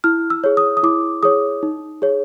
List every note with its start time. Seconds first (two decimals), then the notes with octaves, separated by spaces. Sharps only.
0.04 E4 F6
0.30 E6
0.44 G#4 C#5
0.57 D#6
0.77 D#6
0.83 E4 D6
1.23 G#4 C#5 D#6
1.63 D#4
2.02 G#4 C#5